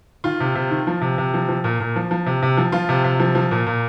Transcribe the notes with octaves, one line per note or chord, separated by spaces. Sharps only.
D#3 F4
C3
C3
D#3
F3
C3
C3
F3
F3
A#2
A#2
F3
F3
C3
C3
F3
F3 F4
C3
C3
F3
F3
A#2
A#2